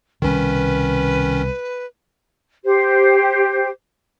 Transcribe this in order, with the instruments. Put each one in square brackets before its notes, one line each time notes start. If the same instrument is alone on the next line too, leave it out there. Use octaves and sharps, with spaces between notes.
[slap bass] C2 B2 [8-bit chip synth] D#3 C#4 [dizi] B4
[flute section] G4 C5